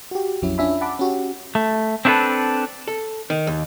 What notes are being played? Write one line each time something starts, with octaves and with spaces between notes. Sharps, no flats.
F#4 G4
A#1 F2 F#3 C#4 E4
C#4 D4 F4 E5 G#5 B5
F#5 A5 B5 D6
C#4 F#4 G4
A3
C4 D4 E4 F4 A4 B4
A4
D#3
D#2